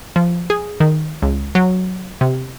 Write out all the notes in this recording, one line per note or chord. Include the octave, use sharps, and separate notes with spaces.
F3
G#4
D#3
C#2
F#3
C3